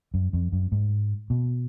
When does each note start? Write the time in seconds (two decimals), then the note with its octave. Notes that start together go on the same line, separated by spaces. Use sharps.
0.14 F#2
0.33 F2
0.52 F#2
0.72 G#2
1.30 B2